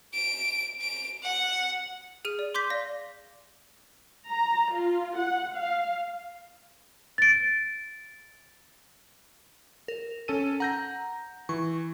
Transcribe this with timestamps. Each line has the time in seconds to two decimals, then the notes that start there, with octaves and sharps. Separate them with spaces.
0.13 D7
0.81 D7
1.23 F#5
2.25 G#4 F6 D#7
2.39 D5
2.54 C6 D6 G6 B6
2.70 D5 F5 A#6
4.29 A#5
4.73 F4
5.16 F#5
5.55 F5
7.18 A6 D7
9.88 A#4
10.28 C#4 A4 D#7
10.60 F#5 A#5 G6 A#6
11.49 E3 C#6